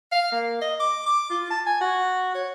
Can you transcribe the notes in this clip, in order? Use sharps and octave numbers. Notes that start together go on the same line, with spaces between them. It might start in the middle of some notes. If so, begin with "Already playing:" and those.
F5
A#3
D#5
D6
D6
F4
A5
G#5
F#4
C#5